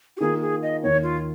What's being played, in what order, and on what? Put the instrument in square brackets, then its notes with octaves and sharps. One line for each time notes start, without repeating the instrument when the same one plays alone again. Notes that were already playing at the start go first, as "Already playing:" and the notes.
[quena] F#4
[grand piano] D#3 A#3 F4 A#4 [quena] G#4
[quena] G#4
D#5
[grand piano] D#2 D#3 A#3 [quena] C#5
[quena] F4